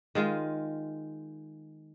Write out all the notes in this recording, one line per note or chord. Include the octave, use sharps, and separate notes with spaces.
D#3 G#3 F4